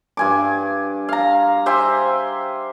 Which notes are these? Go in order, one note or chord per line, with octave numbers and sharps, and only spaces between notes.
G2 G#5 D6
F5 A#5
G4 C5 E5 G#5